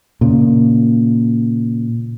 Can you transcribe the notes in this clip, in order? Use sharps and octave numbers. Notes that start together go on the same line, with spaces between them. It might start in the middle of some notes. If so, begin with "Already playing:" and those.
A#2 C#3